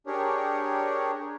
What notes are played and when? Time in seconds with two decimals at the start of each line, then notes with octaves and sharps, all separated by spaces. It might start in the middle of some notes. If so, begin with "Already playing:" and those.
0.07 D4 G4 G#4 A#4 C#5